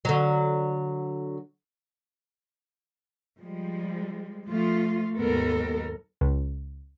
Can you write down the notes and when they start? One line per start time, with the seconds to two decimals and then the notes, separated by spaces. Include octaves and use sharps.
0.05 D3 F#3
3.40 F3 G3 G#3
4.49 F3 A3 F4
5.17 D#2 G#2 F#3 B3 A4 A#4
6.21 C#2